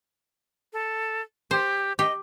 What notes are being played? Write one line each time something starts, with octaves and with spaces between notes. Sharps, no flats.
A4
G4 C5
G4 D#5